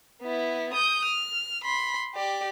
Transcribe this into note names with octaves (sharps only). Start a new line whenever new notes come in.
B3 E4
D#6 G6
F6
B5 C6
G4 D5